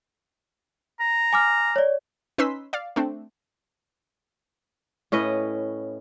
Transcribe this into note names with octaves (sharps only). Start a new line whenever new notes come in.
A#5
G#5 D6 F6
C#5 D5
C#4 D#4 B4 C6 E6 B6
D5 F5
A3 C4 D4
A2 C#4 B4 D#5